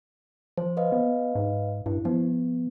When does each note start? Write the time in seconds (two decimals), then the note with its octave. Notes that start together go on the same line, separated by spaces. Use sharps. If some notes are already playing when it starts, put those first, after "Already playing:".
0.57 F3 C5
0.77 B4 D#5 F5
0.92 B3
1.35 G#2
1.86 G2 E4
2.05 F3 B3